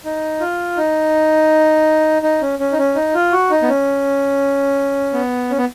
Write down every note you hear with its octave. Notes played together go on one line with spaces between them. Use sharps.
D#4
F4
D#4
D#4
C#4
C#4
D#4
C#4
D#4
F4
F#4
D#4
B3
C#4
B3
C#4
B3